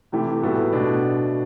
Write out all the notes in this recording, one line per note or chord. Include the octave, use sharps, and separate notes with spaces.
C3 E3 A3 E4 G4
A2 G3 B3 F#4 A4
B2 A3 D4 F#4